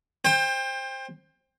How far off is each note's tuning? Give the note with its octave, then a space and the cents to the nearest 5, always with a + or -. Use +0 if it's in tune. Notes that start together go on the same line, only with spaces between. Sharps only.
C5 +15 G5 +30